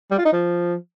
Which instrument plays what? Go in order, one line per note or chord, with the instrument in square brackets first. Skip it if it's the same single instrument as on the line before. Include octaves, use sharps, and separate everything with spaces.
[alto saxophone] G3
F4
D#4
F3